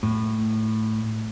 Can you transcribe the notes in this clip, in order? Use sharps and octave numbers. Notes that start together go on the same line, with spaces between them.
A2